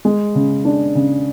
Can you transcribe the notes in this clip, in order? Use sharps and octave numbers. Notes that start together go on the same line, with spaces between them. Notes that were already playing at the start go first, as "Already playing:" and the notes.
G#3
C#3
D4
C#3